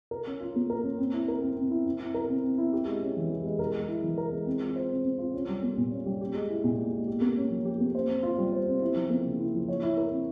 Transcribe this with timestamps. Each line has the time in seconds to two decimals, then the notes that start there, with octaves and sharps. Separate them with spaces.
0.11 A#4
0.27 C#4
0.40 F4
0.56 A#3
0.70 A#4
0.84 C#4
0.98 C4
1.13 E4
1.28 A#4
1.42 C4
1.57 C4
1.71 E4
1.86 C4
2.00 E4
2.14 A#4
2.29 C4
2.44 C4
2.58 E4
2.73 G4
2.87 G#3
3.02 C#4
3.17 E3
3.30 G4
3.45 G#3
3.59 A#4
3.75 G#3
3.88 E4
4.03 E3
4.18 A#4
4.32 G#3
4.46 C4
4.61 F4
4.76 C5
4.91 C4
5.05 C4
5.18 F4
5.34 C#4
5.48 G3
5.63 A#3
5.77 A#2
5.91 C#4
6.06 G3
6.21 G4
6.34 G#3
6.49 E4
6.64 A#2
6.78 G4
6.93 G#3
7.07 G4
7.21 A#3
7.37 C#4
7.50 F3
7.65 G4
7.80 A#3
7.95 C5
8.09 C4
8.23 F4
8.38 G3
8.53 C5
8.67 C4
8.81 E4
8.96 F3
9.10 A#3
9.25 C#3
9.40 E4
9.54 F3
9.68 C#5
9.82 E4
9.97 A#4
10.12 C4